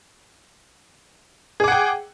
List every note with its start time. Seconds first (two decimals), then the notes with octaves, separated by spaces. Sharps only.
1.60 G#4
1.64 D6
1.68 F#5
1.72 G5